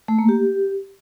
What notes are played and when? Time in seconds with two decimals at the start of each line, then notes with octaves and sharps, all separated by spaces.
0.08 A3
0.18 A#3
0.29 G4